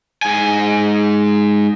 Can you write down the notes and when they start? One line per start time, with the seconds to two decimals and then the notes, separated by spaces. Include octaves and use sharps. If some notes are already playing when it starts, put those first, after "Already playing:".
0.22 G#2 G#5